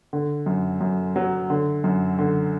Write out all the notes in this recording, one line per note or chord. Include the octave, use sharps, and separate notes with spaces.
D3
F#2
F#2
F#3
D3
F#2
D3